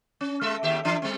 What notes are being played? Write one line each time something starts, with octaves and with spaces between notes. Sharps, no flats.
C#4
G#3 A4 E5
D#2 G4 E5
E3 D4
G3 A3 C4